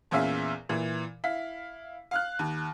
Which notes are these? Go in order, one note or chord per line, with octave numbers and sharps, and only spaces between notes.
E2 A#2 C#4 E5 F5
A#2 E3
E4 F5 B6
F5 F6 F#6
D#2